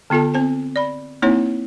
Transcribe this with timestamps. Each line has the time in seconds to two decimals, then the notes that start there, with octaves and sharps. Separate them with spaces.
0.10 D3 B3 F4 A4 A5
0.34 C4 C5 A5
0.76 D5 B5
1.22 A#3 C4 D#4 E4 C#5